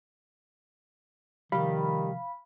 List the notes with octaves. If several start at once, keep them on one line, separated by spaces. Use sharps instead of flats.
C3 D#3 F3 G3 G4 F5 B5